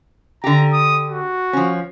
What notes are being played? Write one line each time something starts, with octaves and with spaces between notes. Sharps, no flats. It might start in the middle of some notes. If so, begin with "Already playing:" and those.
D3 G4 A#5
D#6
F#4
F3 C#4